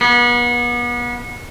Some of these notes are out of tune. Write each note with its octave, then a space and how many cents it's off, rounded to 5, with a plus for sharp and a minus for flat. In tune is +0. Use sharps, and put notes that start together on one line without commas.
B3 -35